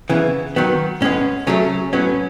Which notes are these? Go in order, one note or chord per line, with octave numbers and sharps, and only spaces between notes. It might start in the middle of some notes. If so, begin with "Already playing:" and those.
C#3 E3 B3
D#3 F#3 B3
A2 G#3 B3 C#4
C#3 F#3 A3 C#4
A2 F#3 B3 C#4